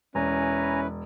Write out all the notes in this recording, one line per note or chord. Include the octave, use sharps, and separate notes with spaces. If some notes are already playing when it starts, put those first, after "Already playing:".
E1 C#4 E4 B4 G#5 A#5